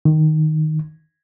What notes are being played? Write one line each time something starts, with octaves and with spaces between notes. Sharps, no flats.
D#3